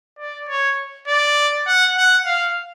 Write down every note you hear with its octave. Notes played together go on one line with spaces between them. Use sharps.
D5
C#5
D5
F#5
F#5
F5